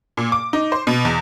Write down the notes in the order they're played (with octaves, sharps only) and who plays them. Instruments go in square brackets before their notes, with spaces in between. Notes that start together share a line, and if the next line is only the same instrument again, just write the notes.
[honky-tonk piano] A#2
D6
D#4
C5
B2
E2